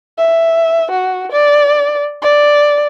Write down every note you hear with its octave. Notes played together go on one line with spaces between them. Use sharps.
E5
F#4
D5
D5